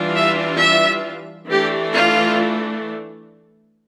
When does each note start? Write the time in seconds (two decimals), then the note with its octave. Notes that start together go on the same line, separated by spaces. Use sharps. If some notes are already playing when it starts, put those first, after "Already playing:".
Already playing: E3 G3 D4 F4
0.15 E5
0.59 E5
1.49 E3 A3 D4 G4
1.95 F4